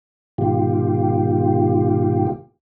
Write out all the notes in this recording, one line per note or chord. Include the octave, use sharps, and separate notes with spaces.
G#2 B2 D#3 F4 G4